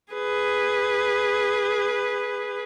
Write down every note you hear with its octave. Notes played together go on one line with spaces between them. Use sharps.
G#4 B4